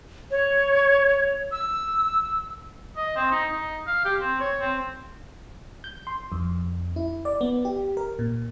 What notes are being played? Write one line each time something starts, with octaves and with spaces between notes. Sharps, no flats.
C#5
E6
D#5
C4
D#4
D#4
F5
G4
C4
C#5
C4
G6
C6
F2
E4
D5
B3
G4
A#4
A#2